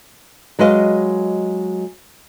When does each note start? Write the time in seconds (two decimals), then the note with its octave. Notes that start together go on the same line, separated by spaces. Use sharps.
0.59 F#3 G#3 B4 D#5 F5